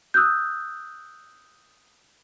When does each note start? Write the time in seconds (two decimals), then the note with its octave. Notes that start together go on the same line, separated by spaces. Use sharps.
0.14 D#6 E6 F#6 G6